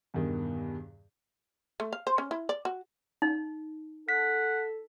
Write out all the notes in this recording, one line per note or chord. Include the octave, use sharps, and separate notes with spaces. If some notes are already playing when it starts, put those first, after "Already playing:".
E2 G2 B2 D#3
A3
F5
C5
C#4
E4
D5
F#4
D#4
A4 F#5 B6